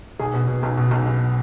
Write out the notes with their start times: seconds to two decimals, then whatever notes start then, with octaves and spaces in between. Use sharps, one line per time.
0.19 B1 G#4
0.34 B2
0.47 B2
0.63 B1
0.77 B2
0.91 B1
1.06 B2